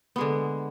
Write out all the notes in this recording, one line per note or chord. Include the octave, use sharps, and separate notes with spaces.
D3 G#3 B3